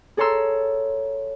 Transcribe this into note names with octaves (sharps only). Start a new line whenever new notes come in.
G#4 A4 C#5 A#5 C6 E6